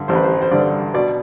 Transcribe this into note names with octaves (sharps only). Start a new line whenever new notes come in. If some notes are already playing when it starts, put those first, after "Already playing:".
Already playing: G2 D3
A1 C5
B4
C5
C5
G2 D3 D5
B2 D5